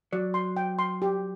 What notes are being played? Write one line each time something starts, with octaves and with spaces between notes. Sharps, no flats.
F#3 D5
C6
G5
C6
G4